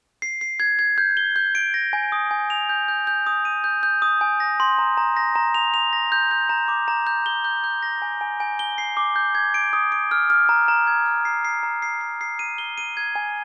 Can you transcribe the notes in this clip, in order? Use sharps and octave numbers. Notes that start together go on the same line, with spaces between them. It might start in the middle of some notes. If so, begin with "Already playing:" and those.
C7
C7
G#6
G#6
G6
G7
G6
D7
A#6
G#5
D#6
G#5
F7
G6
G6
G6
D#6
D#7
G6
G6
D#6
G#5
A#6
C6
A#5
A#5
A#6
A#5
F7
F7
A#6
G6
G6
A#5
D6
A#5
G6
G7
G6
G6
A#6
G#5
G#5
G#5
G7
C7
D6
G6
G#6
D7
D#6
D7
F6
F6
A#5
A#5
G#6
F6
C7
C7
A#5
C7
C7
C7
D#7
G7
D#7
G#6
G#5